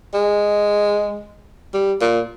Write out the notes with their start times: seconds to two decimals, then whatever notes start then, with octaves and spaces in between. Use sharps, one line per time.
0.14 G#3
1.74 G3
2.01 A#2